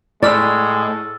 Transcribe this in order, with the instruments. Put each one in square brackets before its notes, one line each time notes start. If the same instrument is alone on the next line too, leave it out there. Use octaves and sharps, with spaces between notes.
[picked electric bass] A2 [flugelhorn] G#3 [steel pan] D5 [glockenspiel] E6 F6 A6